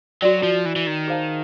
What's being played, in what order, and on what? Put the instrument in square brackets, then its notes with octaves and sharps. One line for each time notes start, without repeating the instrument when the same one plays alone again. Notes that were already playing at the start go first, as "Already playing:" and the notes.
[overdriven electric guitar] F#3 [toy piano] F#4 A4 D5 G5
[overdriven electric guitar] F3
E3
E3
D#3
[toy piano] G#4 C5 F5 A5